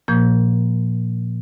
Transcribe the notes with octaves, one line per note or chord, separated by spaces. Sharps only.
A#2 F3 A#3 G6